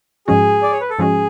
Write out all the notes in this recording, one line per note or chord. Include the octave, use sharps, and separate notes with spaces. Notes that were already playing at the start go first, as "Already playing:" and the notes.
G#2 F3 G#3 C#4 F#4 G#4
D5
C#5
B4
A4
G#2 F3 G#3 C#4 F#4 G#4